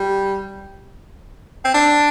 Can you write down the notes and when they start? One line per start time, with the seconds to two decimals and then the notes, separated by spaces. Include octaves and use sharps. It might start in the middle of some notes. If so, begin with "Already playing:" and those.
Already playing: G3
1.64 C4
1.74 D4